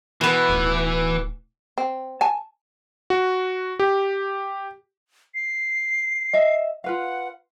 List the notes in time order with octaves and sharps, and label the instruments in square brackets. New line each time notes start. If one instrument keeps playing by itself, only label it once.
[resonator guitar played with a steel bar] B2 B3 [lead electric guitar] E3
[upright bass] D1 D#4
[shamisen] C4
G#5 A5
[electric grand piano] F#4
G4
[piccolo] C7
[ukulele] D#5 E5
[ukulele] F4 B4 F5 [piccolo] F#5